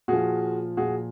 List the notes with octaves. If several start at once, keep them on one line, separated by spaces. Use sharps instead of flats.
A#2 F3 F#4 G#4
A#2 F3 F#4 G#4